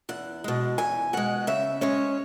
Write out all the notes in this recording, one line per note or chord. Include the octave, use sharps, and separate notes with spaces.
E2 F#5
B2 G#3
E2 G#5
B2 G#3 F#5
C#3 E5
G#3 C#4 C#5